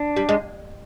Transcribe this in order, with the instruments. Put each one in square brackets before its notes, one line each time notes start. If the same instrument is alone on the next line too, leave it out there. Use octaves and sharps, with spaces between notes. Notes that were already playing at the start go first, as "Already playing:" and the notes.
Already playing: [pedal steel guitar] D4
[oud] G3
G#3